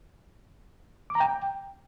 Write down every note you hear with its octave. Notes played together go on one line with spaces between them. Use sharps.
D6
A#5
G5